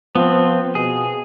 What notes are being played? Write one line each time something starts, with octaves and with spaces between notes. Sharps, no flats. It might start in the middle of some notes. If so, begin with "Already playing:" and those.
F3 B3 C4
B2 G#4